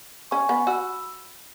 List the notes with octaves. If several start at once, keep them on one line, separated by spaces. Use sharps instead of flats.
C#4 G#5 C#6
B3
F#4 B5 E6